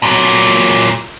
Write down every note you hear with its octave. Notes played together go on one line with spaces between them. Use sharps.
A#2 F#3